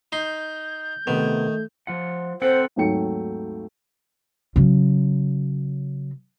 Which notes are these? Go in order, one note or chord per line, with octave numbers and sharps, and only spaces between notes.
D#4 C6 G6
C3 D#3 A3 B3
F3 F4 F#5
C4 A4 C5 F#5
G#1 D#2 F#3 A3 G5 C#7
C#3 F#3